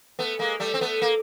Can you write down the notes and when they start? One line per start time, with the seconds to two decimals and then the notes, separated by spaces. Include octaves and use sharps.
0.19 A3 B3
0.39 G#3 A#3
0.60 G3 A3
0.74 C4
0.81 A3 B3
1.02 A#3